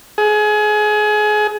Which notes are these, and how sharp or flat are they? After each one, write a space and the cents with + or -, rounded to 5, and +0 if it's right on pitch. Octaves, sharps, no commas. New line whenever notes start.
G#4 +25